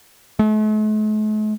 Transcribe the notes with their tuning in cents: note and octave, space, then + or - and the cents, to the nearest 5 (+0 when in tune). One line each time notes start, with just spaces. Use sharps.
A3 -45